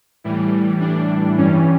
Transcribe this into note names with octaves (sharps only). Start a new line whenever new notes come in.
A2 E3 G3
D4
G2 E3 G3 C#4